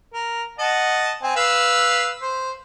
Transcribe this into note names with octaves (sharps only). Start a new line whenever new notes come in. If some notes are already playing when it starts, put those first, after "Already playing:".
A#4
D#5 F#5 A5
C4 G#5
B4 F5 E6
C5